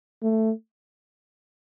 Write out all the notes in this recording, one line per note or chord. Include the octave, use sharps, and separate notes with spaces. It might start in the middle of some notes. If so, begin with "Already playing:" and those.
A3